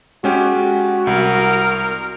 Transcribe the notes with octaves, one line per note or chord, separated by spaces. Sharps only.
G#3 C#4 F#4 G4
C2 A#4